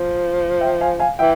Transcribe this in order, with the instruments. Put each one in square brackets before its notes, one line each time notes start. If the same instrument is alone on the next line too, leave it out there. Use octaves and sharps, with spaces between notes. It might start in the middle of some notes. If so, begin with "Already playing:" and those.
Already playing: [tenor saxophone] F3
[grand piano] E5 G5
F5 G#5
F5 G#5
[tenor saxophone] E3 [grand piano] E5 G5